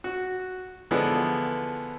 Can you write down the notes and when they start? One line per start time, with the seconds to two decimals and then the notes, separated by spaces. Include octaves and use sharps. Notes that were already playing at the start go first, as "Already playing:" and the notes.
0.04 F#4
0.91 D3 E3 F3 G#3 B3